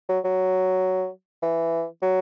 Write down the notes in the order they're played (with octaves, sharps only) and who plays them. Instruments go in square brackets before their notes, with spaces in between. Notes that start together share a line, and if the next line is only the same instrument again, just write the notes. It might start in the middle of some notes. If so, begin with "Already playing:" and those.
[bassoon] F#3
F#3
E3
F#3